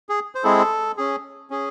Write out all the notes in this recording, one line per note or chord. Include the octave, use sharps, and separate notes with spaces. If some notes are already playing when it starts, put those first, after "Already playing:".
G#4
C5
G#3 C4 E4 G#4 A4
C#4 G#4
C#4 G#4